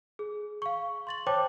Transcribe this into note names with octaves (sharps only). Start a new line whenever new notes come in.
G#4
F5 C#6
C6 A6 F#7
C5 C#5 G5 A5 D6 A6